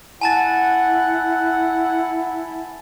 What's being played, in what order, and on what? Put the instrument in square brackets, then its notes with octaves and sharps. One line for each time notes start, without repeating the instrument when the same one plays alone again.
[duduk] E4 [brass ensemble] F#5 [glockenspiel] G#5 A5 A6